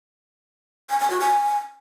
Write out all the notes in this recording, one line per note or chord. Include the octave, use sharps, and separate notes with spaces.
G#5
G#5
F#4
G#5